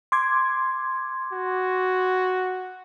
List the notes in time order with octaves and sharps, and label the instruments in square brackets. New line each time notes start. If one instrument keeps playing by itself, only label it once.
[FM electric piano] C6 D6 G#6
[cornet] F#4